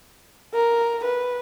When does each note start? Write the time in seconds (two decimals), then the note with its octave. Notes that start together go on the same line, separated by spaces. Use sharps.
0.54 A#4
1.04 B4